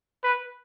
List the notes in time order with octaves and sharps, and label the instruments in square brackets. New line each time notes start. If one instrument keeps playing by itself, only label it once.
[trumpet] B4